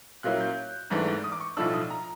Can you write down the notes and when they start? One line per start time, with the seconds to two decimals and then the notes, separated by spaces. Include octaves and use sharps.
0.23 A#2 F#3 A#3 C#4 E4 F#6
0.40 G6
0.90 G#1 G#2 E3 A3 D4
1.24 D#6
1.32 D6
1.40 C#6
1.57 B1 A2 F3 A3 D4 E6
1.74 D#6
1.90 A#5